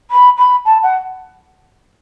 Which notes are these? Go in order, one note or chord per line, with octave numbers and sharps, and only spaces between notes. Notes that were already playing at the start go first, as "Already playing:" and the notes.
B5
B5
A5
F#5